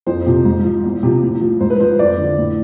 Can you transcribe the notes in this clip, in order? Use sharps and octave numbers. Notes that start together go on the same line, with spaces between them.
F2 C5
C3 F3
G#2
F3
E2
C3 F3
A2
F3
G#2 C5
B4
F3 C5
F2 D5
D3 F3
A2